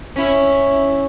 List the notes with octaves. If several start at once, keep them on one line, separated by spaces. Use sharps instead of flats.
C#4 E4